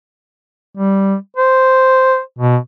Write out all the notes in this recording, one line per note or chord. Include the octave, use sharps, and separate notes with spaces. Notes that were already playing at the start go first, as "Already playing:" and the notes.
G3
C5
B2